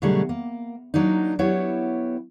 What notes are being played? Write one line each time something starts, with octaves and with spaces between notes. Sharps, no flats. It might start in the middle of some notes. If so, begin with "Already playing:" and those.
B2 D3 F#3 G3 A3 G#4
A#3
F#3 A#3 D4 D#4
F#3 B3 E4 G4 C#5